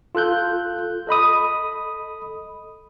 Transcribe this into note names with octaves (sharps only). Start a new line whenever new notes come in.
F4 A4 F#6 G6
A4 D#5 B5 D#6